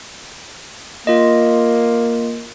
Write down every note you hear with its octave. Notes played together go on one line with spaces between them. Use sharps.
A#3 F4 D#5